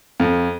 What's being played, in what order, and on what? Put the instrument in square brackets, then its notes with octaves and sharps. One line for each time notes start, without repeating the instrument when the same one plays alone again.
[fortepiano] F2